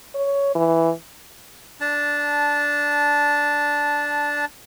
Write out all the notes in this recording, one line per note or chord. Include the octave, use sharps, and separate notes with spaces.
C#5
E3
D4 A5